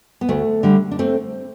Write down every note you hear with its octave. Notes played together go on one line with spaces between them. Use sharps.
B3
D2 A3
D3 G3
D4
A3 C4